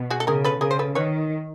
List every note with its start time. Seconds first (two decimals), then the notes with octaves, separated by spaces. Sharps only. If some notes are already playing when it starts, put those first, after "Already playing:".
Already playing: B2
0.10 F#4 G#4
0.20 A4
0.27 C#3 G#4 A#4
0.44 A4 B4
0.61 C#3 G#4 A#4
0.71 C5
0.79 A4 B4
0.95 D#3 B4 C#5